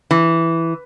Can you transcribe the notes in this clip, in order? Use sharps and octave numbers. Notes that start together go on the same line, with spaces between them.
E3